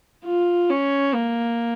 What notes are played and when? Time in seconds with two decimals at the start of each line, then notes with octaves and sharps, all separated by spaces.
0.25 F4
0.70 C#4
1.14 A#3